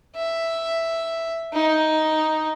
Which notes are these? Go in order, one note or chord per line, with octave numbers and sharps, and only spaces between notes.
E5
D#4